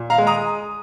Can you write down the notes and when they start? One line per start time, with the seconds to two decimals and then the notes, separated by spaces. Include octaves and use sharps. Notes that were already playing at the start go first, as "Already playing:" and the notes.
Already playing: A#2
0.10 F5 A#5
0.18 G#3
0.27 A#5 D#6